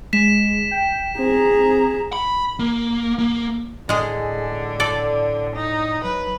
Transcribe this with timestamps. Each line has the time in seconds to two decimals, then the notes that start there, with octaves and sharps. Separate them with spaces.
0.13 G#3 B6 E7
0.71 G5
1.19 C4 G#4 A#5
2.13 B5
2.59 A#3
3.19 A#3
3.89 A2 D3 G#3 G#4
4.80 A4 D5
5.55 D#4
6.04 F#3 B4